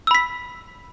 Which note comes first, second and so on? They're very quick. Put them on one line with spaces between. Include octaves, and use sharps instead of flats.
E6 B5 B6